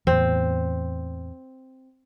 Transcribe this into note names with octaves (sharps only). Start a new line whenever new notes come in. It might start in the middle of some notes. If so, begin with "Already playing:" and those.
E2 A2 C4